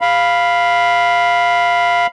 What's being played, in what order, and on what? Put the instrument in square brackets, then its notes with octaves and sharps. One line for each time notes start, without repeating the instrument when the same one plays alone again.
[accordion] F5 B5